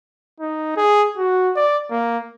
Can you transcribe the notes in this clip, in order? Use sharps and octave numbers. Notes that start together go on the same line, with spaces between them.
D#4
G#4
F#4
D5
A#3